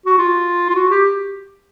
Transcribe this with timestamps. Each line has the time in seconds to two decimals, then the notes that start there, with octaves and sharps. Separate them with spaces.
0.06 F#4
0.18 F4
0.69 F4
0.75 F#4
0.90 G4